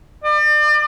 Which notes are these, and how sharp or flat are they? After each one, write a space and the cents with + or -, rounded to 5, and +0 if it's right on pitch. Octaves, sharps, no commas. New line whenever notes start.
D5 +40